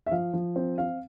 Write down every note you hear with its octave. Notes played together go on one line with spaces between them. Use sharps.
E5
F3 F5
F3
C4
C4 F5